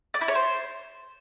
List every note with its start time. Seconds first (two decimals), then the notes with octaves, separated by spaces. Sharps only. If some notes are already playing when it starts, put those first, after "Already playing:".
0.14 D5
0.21 E4
0.28 C#5
0.35 C5